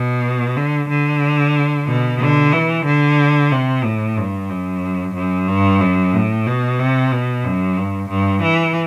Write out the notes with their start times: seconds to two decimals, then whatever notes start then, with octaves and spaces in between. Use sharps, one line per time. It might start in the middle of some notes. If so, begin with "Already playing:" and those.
Already playing: B2
0.56 D3
0.89 D3
1.87 B2
2.20 D3
2.53 E3
2.86 D3
3.52 C3
3.85 A2
4.17 G2
4.50 F#2
5.15 F#2
5.48 G2
5.81 F#2
6.13 A2
6.46 B2
6.79 C3
7.12 B2
7.44 F#2
7.77 G2
8.09 G2
8.42 E3